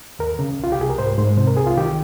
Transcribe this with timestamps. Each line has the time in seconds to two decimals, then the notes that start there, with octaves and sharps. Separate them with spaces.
0.19 D#2 A#4
0.39 C#3
0.59 C2 F4
0.72 G4
0.79 C2 G#4
0.90 A#4
0.98 G#2 C5
1.18 G#2 C5
1.37 C3 C5
1.47 A#4
1.57 C2 G#4
1.67 F4
1.77 D#3 G4